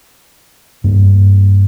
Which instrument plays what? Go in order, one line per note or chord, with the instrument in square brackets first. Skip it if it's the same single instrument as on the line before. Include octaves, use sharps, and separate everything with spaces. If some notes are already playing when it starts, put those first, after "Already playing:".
[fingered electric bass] G2 A#3